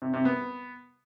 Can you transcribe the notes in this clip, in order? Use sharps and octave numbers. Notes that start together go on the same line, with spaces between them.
C3
C3
B3